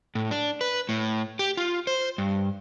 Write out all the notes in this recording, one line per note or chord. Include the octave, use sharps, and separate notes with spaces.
A2
D4
B4
A2
G4
F4
C5
G2